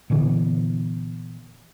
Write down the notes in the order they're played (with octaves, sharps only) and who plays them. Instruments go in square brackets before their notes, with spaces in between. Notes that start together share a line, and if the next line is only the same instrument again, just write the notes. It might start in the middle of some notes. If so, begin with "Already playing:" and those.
[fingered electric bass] A#2 D3 E3 B3